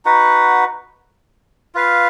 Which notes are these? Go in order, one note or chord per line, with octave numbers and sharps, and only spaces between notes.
D#4 F#4 B4 F#5
F4 B4 F5